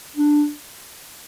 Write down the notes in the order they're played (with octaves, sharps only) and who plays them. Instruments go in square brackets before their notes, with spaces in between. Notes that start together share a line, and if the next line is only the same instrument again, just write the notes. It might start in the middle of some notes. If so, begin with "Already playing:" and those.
[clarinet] D4